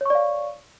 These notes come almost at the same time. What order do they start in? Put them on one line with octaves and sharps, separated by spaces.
C#5 C#6 D5 F5